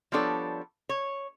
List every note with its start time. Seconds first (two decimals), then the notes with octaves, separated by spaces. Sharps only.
0.12 F3 G3 B3 D4 A4 C#5
0.89 C#5